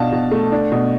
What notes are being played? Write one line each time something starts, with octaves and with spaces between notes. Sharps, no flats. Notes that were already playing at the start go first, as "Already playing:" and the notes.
Already playing: B2 D4 F5 A5
B2
A3
D4
B2